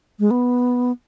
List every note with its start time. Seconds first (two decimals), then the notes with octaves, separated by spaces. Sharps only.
0.20 G#3
0.31 B3